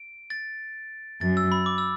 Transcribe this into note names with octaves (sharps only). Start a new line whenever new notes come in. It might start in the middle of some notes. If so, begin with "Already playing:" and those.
Already playing: D7
A6
F#2 A6
E6
B5
D6
E6